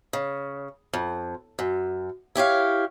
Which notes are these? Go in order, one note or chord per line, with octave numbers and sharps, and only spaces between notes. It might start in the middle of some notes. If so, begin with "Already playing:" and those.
C#3
F2
F#2
E4 G4 C#5 F5